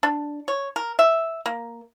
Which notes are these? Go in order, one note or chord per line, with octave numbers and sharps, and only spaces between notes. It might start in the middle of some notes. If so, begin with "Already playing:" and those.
D4
C#5
A#4
E5
A#3